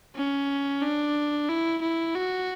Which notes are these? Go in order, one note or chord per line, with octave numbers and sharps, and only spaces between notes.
C#4
D4
E4
E4
F#4